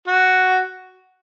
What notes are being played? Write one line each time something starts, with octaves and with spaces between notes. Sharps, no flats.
F#4